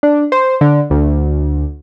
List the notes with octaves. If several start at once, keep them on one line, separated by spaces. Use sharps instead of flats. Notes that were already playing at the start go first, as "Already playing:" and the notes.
D4
C5
D3
D2